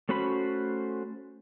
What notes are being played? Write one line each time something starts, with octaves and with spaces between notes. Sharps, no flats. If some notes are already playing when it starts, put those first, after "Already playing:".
A3 C#4 F#4 C5 B5